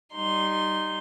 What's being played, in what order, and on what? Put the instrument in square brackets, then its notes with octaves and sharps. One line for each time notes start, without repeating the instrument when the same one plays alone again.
[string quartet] G3 D#4 C6